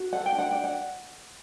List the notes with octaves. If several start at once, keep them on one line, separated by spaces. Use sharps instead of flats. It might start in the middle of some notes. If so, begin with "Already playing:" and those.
Already playing: F#4
A4 F#5
G5
D4
F#5
D4 G5
F#5